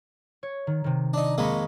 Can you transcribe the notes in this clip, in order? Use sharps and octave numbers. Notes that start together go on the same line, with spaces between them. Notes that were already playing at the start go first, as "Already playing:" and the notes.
C#5
D#3
C3 D#3
D4 D#4
F2 G#3 A#3 D#5 B5 C#6